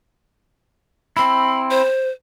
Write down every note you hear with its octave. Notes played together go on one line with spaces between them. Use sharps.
C4 E4 B5
C5